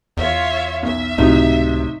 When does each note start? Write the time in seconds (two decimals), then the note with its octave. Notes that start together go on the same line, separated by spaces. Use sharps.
0.17 E2 F4 C#5 E5
0.83 B1 E5
1.18 C#2 A2 C3 F#3 D#4